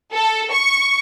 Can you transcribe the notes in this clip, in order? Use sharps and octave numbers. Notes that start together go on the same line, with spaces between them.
A4
C#6